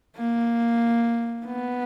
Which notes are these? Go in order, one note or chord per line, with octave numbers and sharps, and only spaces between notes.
A#3
B3